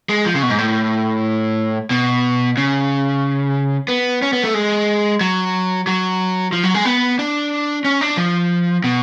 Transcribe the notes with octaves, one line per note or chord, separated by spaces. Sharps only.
G#3
F3
C#3
B2
G#2
A2
B2
C#3
B3
C#4
B3
A3
G#3
F#3
F#3
F3
F#3
G#3
B3
D4
C#4
D4
F3
B2